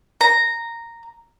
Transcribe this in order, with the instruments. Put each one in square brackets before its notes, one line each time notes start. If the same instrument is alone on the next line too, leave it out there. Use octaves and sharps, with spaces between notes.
[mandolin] A#5